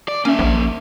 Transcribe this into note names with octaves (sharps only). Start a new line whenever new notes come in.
D5
A#3 C#4 E5
A#1